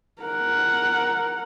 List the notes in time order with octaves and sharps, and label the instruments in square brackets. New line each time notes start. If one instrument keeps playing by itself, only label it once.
[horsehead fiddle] A#4 F#5